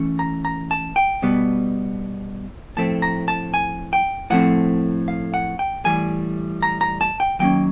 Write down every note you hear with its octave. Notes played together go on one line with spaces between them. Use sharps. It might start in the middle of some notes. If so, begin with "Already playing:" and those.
Already playing: E3 A3 C#4
A#5
A#5
A5
G5
B2 G3 B3
A2 F3 A3 C4 A5
A#5
A5
G#5
G5
A2 F3 A3 C4 F#5
F5
F#5
G5
A2 E3 G3 G#5
A#5
A#5
A5
G5
D#3 F#3 A#3 C#4 G5